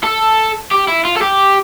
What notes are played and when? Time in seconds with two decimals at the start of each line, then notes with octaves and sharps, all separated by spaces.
0.04 A4
0.71 G4
0.88 E4
1.05 F4
1.16 A4
1.21 G4